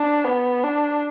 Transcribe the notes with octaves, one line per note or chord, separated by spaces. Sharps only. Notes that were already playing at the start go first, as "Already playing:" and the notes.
Already playing: D4
B3
D4